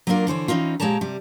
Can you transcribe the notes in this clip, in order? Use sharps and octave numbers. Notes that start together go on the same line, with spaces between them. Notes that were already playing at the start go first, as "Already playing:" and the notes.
F#3 A#3 B3 D4 F4 A#4
D3 E3 C5 C#5
E3 C4 C#4 D#4 F4
A#2 G#3 G4 C#5 A5 A#5
C3 G3